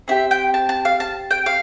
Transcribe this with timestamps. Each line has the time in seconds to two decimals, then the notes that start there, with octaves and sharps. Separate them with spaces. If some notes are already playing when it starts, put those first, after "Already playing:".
0.08 C4 E4 G4 E5
0.31 G5
0.54 A5
0.69 A5
0.85 F5
1.00 A5
1.31 G5
1.46 F5